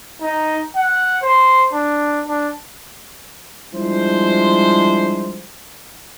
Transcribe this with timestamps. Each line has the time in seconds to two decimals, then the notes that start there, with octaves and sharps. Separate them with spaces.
0.21 D#4
0.76 F#5
1.22 C5
1.73 D4
2.27 D4
3.74 F3 G3 G#3 D4 E4 C5